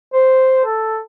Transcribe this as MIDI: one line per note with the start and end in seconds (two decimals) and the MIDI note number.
0.13 0.60 72
0.65 1.00 69